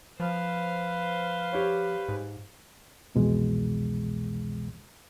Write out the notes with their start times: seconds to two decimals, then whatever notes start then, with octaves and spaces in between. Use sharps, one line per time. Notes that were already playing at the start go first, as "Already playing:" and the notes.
0.20 F3 B4 C5 F5
1.53 G4 C#5
2.09 G#2
3.15 C2 F2 B2 E3 G#3